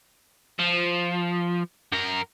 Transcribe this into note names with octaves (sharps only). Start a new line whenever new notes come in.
F3
F#2 A#4